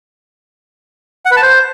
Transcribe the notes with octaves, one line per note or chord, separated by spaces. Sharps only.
F#5
B4
A5
C5